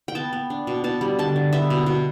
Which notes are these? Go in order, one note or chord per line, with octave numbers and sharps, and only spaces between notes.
G5
B3 A5
B3
D4
B2
B2 A5
G3
D3 A5
D3
B3 E5
B2
B2